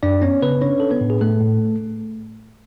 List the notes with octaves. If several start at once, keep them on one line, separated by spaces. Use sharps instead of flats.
F#2 D4 D5
B3 C#4 C#5
C#3 B3 B4
C#4 D4 C#5
D4 A4
B3 B4
A2
G#4
A2 A3 A4
A2